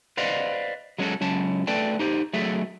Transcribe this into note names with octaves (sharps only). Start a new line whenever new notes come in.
B4 C5 D5 D#5 F5 F#5
F#3 G#3 C#4 F4 F#4 A4
C#2 F#3 C#4 A5
A3 A4 B4 D5 G5 A5
D#4 G4 C5
F#3 A3 G#4 A4 E5